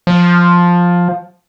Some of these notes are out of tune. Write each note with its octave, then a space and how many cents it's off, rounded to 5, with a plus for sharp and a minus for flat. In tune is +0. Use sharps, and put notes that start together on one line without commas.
F3 +10